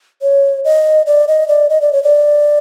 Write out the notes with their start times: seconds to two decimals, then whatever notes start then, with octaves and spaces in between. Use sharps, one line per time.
0.22 C#5
0.64 D#5
1.06 D5
1.28 D#5
1.48 D5
1.70 D#5
1.81 D5
1.92 C#5
2.03 D5